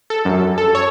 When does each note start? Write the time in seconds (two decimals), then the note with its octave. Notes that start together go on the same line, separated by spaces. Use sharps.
0.10 A4
0.25 F#2
0.58 A4
0.75 C#5